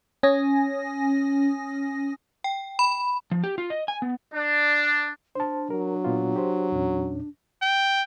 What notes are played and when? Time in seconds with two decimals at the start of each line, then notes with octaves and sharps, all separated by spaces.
0.23 C#4 G#5 D#6 A#6
2.44 G5
2.79 B5
3.31 F3
3.44 G4
3.58 F4
3.70 D#5
3.88 G#5
4.02 B3
4.34 D4
5.35 D4 C5 A5
5.70 F#3 A#4
6.05 A#2 B3 F4
6.36 G4 C5
6.72 E2 A#2 C#4
7.62 G5